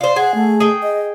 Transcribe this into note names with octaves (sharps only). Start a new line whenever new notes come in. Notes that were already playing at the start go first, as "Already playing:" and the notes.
F4 C5 D5
G#4 F#5
A3
G#4 G5
D#5